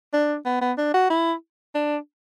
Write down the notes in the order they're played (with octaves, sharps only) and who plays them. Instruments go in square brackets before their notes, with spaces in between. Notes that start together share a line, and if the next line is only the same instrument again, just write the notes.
[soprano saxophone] D4
B3
B3
D4
F#4
E4
D4